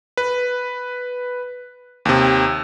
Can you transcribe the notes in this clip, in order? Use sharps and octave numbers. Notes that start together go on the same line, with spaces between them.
B4
D#2 C3